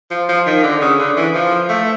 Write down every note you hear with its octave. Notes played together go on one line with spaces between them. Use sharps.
F3
F3
D#3
D3
C#3
D3
E3
F3
A3